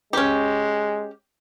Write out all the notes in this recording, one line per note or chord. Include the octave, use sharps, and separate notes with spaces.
G#3 C#4 G4